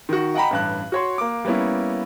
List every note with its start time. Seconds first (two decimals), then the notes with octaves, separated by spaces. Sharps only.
0.09 D#3 F#4
0.35 D#5 F#5 G5 A#5 B5
0.50 A1 G2 F#6
0.92 F#4 C#5 C6
1.18 A#3 D6
1.45 G3 A#3 B3 C#4 E4